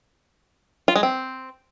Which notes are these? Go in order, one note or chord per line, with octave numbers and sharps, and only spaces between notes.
F4
G#3
C4